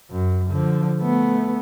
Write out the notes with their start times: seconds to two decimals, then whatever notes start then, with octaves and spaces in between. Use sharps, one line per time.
0.11 F#2
0.50 D3 F3
1.00 A3 B3